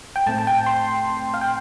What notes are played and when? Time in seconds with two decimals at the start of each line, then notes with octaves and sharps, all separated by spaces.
0.16 G5
0.26 A2 A3 C4 A5
0.38 A5
0.47 G5
0.66 C6
1.34 F5
1.41 G5